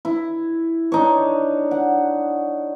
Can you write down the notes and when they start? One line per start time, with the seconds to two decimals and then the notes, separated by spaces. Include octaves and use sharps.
0.05 E4
0.92 D4 D#4 C#5
1.71 F#5